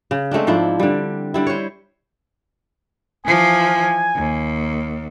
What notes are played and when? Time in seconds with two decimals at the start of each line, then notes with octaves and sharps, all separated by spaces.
0.11 C#3
0.31 G#3 A3 C4 D4
0.47 G#2 F3 D4 E4
0.80 D3 G3
1.34 D3 G3 E4
1.47 C5 C#5
3.26 E3 F3 G#5
4.16 D#2